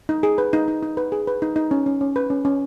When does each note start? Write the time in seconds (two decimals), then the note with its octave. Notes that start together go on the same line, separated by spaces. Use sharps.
0.09 D#4
0.23 G#4
0.38 B4
0.53 D#4
0.68 D#4
0.83 D#4
0.97 B4
1.12 G#4
1.27 B4
1.42 D#4
1.56 D#4
1.71 C#4
1.86 C#4
2.01 C#4
2.16 B4
2.30 C#4
2.45 C#4